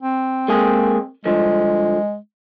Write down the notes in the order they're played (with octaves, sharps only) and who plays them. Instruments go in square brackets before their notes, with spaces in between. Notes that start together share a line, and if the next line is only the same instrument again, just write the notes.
[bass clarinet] C4
[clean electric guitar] G#3 A#3 G#4
[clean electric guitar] G2 D3 F3 [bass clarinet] G#3